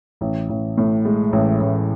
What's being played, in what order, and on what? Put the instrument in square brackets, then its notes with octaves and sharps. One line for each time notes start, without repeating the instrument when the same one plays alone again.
[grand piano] A1
A1
A2
G#3
A1
A1